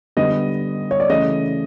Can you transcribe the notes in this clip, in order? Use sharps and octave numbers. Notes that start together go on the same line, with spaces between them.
D3 G3 B3 D#5
C#5
D5
C#3 E3 A3 D#5